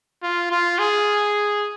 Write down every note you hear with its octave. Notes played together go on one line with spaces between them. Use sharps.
F4
F4
G#4